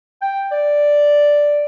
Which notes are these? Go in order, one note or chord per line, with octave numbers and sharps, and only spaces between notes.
G5
D5